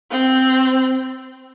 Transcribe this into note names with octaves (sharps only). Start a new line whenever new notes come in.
C4